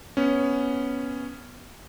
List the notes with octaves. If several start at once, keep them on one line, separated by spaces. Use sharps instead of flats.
B3 C#4